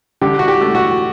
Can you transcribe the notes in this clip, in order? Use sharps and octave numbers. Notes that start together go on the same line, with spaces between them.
D3 G4
F#4
G4
A3
F#4